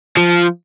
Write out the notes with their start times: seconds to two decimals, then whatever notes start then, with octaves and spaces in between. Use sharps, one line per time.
0.17 F3